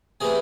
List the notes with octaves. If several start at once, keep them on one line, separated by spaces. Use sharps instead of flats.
C3 E3 A3 G#4